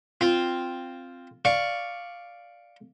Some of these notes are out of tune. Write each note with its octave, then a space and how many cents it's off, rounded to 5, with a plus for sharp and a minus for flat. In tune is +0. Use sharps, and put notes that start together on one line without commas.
C4 +0 F4 +0
D5 +0 F5 +0 C#6 +0